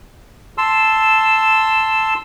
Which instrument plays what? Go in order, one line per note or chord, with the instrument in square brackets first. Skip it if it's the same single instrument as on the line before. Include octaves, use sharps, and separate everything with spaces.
[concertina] A5 C6 E6